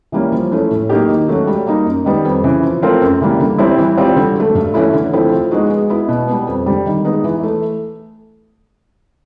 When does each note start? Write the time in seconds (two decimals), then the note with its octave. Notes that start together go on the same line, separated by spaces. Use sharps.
0.12 E3 G3 A#3 C#4
0.32 F3
0.52 A3 C#4 E4
0.70 A2
0.89 F#3 A#3 D#4 G4
1.09 D#3
1.28 F#3 A3 C#4 F#4
1.47 G3
1.66 A#3 D#4
1.86 F#2
2.05 D#3 G3 B3
2.24 F2
2.43 C#3 E3
2.63 F3
2.82 A3 C4 F4 A#4
3.01 F#2
3.21 C#3 E3 G3 A#3
3.40 D3
3.58 G3 C4 E4
3.78 E3
3.97 G3 C4 F4
4.16 D3
4.35 F#3 A3
4.55 G2
4.74 E3 A3 C#4 E4
4.94 D3
5.13 F3 A3 C4 E4
5.32 F3
5.51 G#3 B3 D#4 F#4
5.70 G#3
5.90 B3 E4
6.08 B2
6.27 G3 B3
6.47 F2
6.66 D3 G3
6.85 D#3
7.05 G#3 B3 D#4
7.24 E3
7.43 A3